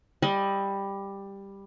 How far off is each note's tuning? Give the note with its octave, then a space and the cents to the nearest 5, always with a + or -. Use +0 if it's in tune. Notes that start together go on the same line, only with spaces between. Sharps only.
G3 +10 D#5 +30